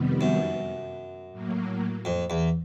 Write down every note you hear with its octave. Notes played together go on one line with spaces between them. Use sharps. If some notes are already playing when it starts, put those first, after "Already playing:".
Already playing: F2 C3 D#3 G3 B3
F#2
A2 F#3 A#3
F2
E2